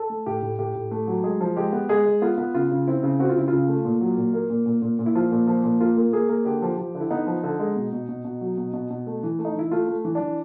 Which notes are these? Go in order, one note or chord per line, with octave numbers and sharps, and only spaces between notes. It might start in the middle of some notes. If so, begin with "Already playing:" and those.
Already playing: A4
A3
A2 G4
A2
A2 G4
A2
A3
F#3
G#3 G#4
F3
G#3 G4
B3
G#3 G#4
G#3
B3 F4
B3
C#3 F4
C#3
C4 E4
C#3
C4 F#4
F4
C#3 E4
C#3 F4
A3
A#2
F#3
A#2
A#3
A#2
A#2
A#2
A#2
E4
F3 F4
A#2
F3
A#2
A#3 F4
A#3
A#3 G#4
A#3
D3 G4
F3
F3
D3
E4
B3 D#4
F3
D3
G#3
B2
B2
B2
B2
F#3
B2
B2
B2
A3
E3
A3
D#4
E3 E4
A3 F4
A3
E3
D4
E3